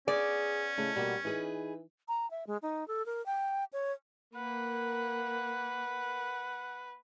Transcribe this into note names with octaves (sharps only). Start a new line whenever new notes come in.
B3 C#4 G#4 D5
C#3 A3 E4 D#5
B2 G3 A#3 F#4
E3 D#4 G#4 B4
A#5
E5
G#3
D#4
A4
A#4
G5
C#5
A#3 B4 F#5